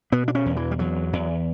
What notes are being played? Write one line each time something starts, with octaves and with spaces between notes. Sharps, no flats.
B2 B3
D4
C#4
E2
E3
G3
E2 F#3
E2